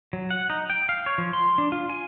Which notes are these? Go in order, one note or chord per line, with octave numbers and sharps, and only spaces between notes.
F#3
F#5
D#4
G5
F5
C#5
F3
C6
D4
F4
G#5